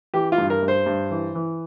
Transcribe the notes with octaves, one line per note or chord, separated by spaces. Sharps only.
E3 G4
F4
G2
A#4
G2
C5
G2
E3
E3